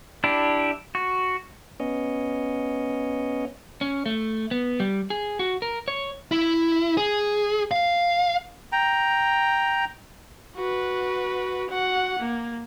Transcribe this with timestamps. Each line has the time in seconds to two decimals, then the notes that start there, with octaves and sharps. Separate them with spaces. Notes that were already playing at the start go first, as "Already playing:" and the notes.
0.24 D4 E4 G4
0.95 F#4
1.80 B3 C#4 C#5 D#5
3.81 C#4
4.06 A3
4.51 B3
4.80 G3
5.10 G#4
5.39 F#4
5.62 A#4
5.88 C#5
6.31 E4
6.97 G#4
7.71 F5
8.72 G5 A#5
10.56 F#4 B4
11.70 F#4 F#5
12.19 A#3